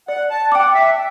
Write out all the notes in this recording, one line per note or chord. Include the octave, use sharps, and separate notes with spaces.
D5 F#5
A5
F#5 G5 D6
E5